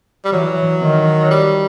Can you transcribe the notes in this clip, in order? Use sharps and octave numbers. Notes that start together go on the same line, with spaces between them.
G3
E3 F#3
D#3
G3